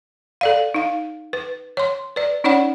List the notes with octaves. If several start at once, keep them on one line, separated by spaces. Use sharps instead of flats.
A4 D5 F5
D#4 F5
B4
C#5 C6
B4 D5
C#4 D#4 C#5 D5 F#5 B5